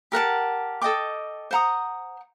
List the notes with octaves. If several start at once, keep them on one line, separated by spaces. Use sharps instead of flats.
G4 A#4 F#5 A5
A4 D#5 G5 D6
C5 F#5 A#5 D#6